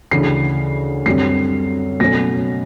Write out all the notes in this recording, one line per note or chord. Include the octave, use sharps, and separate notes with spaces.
D2 C#3 E3 C7
F#2 D3 G3 C4 C7
B2 F#3 A3 C#4 A#6